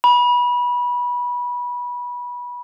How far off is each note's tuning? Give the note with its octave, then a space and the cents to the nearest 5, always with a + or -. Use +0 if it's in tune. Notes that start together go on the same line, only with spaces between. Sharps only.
B5 -20